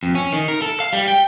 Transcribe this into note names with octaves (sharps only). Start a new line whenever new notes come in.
F2
C#4
D#3
A#4
A4
F5
G3
G5